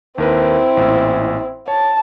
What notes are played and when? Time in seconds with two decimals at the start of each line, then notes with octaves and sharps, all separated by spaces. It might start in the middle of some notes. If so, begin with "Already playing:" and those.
0.18 D#2 C4 E4 A#4 B4
0.77 A1 A#2
1.68 C#5 A5